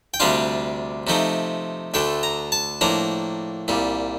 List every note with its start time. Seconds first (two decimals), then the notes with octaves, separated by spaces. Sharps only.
0.14 G5
0.20 D2 C3 G3 D4 F4 F5
1.07 C3 F3 A3 D#4
1.94 D2 D3 A3 G5
2.23 A#5
2.52 A5
2.81 A2 F3 A#3 D4 A#5
3.68 C2 A#2 G3